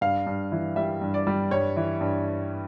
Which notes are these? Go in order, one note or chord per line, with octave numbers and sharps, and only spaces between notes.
G2 F5
G2
E3
G3 E5
G2
D5
G3
G2 C#5
E3
G2